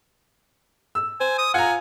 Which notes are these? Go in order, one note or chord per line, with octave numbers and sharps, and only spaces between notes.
E6
C5 G#5
D#6
F4 F#5 G#5 A#5